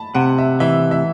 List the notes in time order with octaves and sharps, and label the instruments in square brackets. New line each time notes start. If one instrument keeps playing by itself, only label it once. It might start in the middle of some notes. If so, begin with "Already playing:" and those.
Already playing: [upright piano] A5 B5
[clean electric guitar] C3 [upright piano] F#5
[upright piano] E5
[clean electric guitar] E3 [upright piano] E5
[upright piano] E5